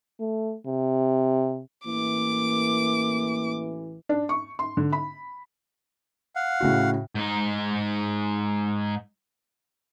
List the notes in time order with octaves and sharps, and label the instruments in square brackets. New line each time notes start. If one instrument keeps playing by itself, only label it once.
[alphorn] A3
C3
[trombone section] A1 E3 [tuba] A#3 [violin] D6
[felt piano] D4
C#6
C6
D3
B5
[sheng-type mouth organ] F5 F#5
[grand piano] A2 C#3 F#4
[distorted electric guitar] G#2 D#4